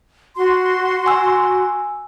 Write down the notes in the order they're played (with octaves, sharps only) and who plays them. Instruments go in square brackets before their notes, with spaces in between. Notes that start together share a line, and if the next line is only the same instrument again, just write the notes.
[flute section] F#4 C6
[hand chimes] G#5 E6